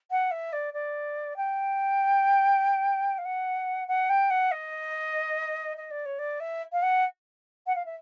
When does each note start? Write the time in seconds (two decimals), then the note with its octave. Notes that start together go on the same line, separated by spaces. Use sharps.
0.11 F#5
0.31 E5
0.53 D5
0.73 D5
1.37 G5
3.18 F5
3.25 F#5
3.88 F#5
4.09 G5
4.30 F#5
4.51 D#5
5.77 D#5
5.91 D5
6.05 C#5
6.19 D5
6.40 E5
6.72 F5
6.82 F#5
7.67 F#5
7.75 F5
7.85 E5